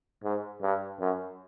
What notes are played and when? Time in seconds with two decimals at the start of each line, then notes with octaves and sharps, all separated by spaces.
0.24 G#2
0.62 G2
1.00 F#2